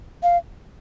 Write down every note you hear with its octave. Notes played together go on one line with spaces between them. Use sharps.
F5